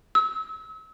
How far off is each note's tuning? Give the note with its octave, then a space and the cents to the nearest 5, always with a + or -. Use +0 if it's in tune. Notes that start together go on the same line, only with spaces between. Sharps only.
E6 -35